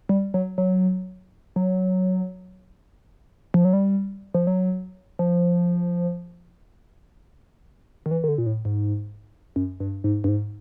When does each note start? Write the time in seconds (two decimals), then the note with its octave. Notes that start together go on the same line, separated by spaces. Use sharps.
0.09 G3
0.34 F#3
0.58 F#3
1.56 F#3
3.54 F3
3.65 F#3
3.73 G3
4.34 F3
4.47 F#3
5.19 F3
8.06 D#3
8.11 E3
8.24 D#3
8.28 D3
8.38 A#2
8.46 A2
8.65 G#2
9.56 F#2
9.80 G2
10.04 G#2
10.24 G2
10.28 G#2